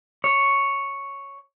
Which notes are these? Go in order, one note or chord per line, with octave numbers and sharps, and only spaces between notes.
C#5